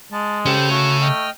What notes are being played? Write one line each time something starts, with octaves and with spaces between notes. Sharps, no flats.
G#3 A5
C#3 C#4 G4 A4 C5
A3 F#4
D#5 G5 F6